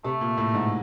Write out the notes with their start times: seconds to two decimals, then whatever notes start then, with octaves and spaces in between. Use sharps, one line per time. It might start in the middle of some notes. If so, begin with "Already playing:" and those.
0.04 C3 A3
0.21 A#2
0.37 A2
0.54 G#2